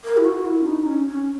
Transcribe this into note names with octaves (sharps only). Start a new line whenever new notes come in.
A#4
E4
F#4
E4
C#4
D#4
C#4
C#4